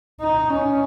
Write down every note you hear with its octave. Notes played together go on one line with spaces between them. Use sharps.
D#4
C#4